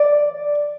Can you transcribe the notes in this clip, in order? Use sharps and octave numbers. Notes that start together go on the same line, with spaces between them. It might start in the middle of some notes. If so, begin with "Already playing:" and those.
Already playing: D5